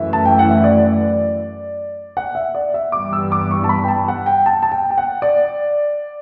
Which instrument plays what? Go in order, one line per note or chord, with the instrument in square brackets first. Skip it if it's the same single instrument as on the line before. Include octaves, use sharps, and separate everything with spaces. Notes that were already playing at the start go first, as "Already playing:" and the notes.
Already playing: [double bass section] F#2 E3 A3 [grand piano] E5
[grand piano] A5
G5
F#5
E5
D5
F#5
E5
D5
E5
[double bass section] G2 E3 G3 B3 [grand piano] D6
[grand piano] E6
D6
C#6
A5
B5
G5
A5
F#5
G5
A5
A5
G5
G5
F#5
D5